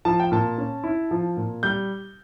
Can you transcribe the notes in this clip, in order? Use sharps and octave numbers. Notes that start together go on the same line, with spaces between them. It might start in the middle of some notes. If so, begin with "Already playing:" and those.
F3 A5
G5
A#2 A5
C#4
E4
F3
A#2
G3 G6